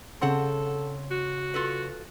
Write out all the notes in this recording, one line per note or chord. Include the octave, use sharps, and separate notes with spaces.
C#3 C4 A4 C#5 F#5 A5 C6
F#4
F4 A4 B4